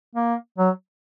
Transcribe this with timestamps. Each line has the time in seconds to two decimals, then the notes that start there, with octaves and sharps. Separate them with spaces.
0.15 A#3
0.58 F#3